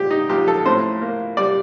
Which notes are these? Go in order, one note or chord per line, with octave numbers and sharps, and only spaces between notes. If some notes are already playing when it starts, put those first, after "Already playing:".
Already playing: A#2 G3 G4
D#4
A#1 G4
A4
A2 C5
A#3
G3 D5